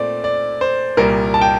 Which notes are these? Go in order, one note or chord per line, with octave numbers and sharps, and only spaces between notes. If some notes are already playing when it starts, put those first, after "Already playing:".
Already playing: A#2 A3 C4 D5
D5
C5
C2 A#2 G3 A#4
A5
G5